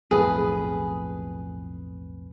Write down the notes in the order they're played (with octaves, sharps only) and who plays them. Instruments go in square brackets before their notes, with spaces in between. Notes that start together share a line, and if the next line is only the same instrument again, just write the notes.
[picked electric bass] B1 F2 A2 [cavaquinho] G#4 B4